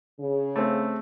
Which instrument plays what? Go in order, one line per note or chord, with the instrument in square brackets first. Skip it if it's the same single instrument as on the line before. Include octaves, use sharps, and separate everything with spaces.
[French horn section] C#3
[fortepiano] A3 C4